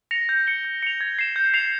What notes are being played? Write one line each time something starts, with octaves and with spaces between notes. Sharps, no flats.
A#6 C#7 F7
G6
C#7 G7
G6
C#7 F7
G#6
C7 E7
G6
C7 F7